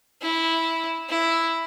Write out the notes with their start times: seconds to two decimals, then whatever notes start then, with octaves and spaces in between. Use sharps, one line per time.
0.22 E4
1.09 E4